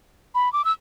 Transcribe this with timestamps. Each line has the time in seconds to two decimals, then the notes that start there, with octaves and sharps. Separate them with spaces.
0.35 B5
0.53 D6
0.65 E6